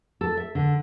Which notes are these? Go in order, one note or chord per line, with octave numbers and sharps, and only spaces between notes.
A4
E5
D3